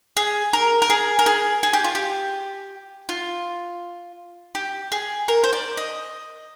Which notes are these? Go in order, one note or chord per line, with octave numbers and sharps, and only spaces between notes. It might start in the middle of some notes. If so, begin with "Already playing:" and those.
G#4
A#4
A#4
G#4
A#4
G#4
G#4
G4
F4
G4
F4
G4
G#4
A#4
C5
D5
D#5